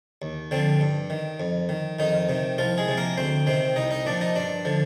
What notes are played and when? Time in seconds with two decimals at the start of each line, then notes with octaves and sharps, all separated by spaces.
0.22 D#2
0.51 D3 F3 C4
0.81 G2
1.10 D#3
1.40 F2
1.69 D#3
1.99 F2 D#3 D#4
2.29 C3 D#3
2.58 C2 F3 F4
2.78 G#3 G#4
2.88 C3 F3
2.97 A#3 A#4
3.18 D2 C4 C5
3.46 C3 D#3 C4 C5
3.76 C2 D#4 D#5
3.91 D#4 D#5
4.05 A#2 F3 D4 D5
4.21 D#4 D#5
4.35 G2 D4 D5
4.65 D3 F3